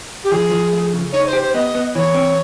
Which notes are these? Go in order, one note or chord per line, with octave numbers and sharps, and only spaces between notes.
G4
F3 G#4
F3
A3
C#3
D#4 C#5
C5
G4
C5
B3 D#5
B3
E3 C#5
C4